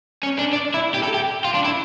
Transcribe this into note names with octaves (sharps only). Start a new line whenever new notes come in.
C#4
D4
D4
E4
G4
A4
G4
F4
D4
E4